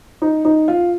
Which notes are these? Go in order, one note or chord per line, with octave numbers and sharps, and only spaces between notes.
D#4
D#4
F4